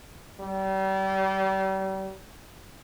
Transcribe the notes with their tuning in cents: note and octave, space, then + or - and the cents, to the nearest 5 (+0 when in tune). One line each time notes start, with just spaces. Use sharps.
G3 -35